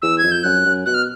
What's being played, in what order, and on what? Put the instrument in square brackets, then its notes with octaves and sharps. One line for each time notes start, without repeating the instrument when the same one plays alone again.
[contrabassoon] E2 [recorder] E6
[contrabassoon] F2 [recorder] G#6
[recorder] G6
[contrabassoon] F#2 [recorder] F#6
[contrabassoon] F#2
[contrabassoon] B2 [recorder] F#6
[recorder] F6